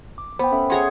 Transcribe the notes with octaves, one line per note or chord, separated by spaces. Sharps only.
D6
B3 C5 G5 B5
C#4 A4 E5
C#4 G#4 C#5 E5 F#5 C6